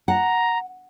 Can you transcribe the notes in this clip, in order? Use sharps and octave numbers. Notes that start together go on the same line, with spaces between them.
F#5 A#5